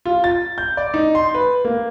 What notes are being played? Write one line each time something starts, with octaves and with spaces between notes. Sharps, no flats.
F4
A6
G6
D5
D#4
C6
B4
A#3